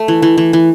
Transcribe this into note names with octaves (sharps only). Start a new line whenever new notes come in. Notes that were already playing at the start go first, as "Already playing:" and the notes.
Already playing: A3
E3
E3
E3
E3